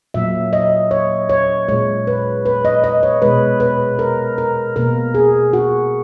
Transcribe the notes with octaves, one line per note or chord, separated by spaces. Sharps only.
A#2 F#3 A#3 E5
D#5
C#5
C#5
A#2 G#3 C#5
B4
B4
D#5
D#5
C#5
B2 G#3 B4
B4
A#4
A#4
B2 A#3 A#4
G#4
F#4